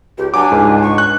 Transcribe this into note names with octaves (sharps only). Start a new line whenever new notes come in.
C#2 G4
F#3 D4 G#5 D6
C#2 G#2
C#6
F#6